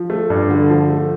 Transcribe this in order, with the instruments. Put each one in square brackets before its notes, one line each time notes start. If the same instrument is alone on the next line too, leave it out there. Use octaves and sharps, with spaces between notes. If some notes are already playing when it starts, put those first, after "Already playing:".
Already playing: [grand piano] F3
A3
G2
D3
F3
A3